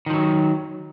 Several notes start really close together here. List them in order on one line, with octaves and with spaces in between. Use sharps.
D#3 F3 F#3